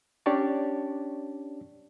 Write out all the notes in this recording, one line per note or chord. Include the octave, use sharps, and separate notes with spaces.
C#4 D4 G4 C#5 D5 A5